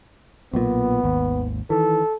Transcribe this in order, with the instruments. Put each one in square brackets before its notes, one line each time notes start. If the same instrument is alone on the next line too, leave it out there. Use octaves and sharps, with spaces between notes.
[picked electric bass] B1 A#2 [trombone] B3
[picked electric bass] G#1 D#2
[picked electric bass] D#3 E3 [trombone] A4